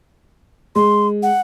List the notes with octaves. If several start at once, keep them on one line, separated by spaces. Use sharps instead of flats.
G#3 C6
F#5